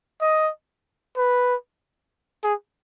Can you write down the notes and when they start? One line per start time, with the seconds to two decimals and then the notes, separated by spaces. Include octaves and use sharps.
0.21 D#5
1.17 B4
2.44 G#4